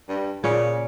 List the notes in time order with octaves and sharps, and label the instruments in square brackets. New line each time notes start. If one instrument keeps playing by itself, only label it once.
[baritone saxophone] G2
[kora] A#2 C#4 [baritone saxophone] C#3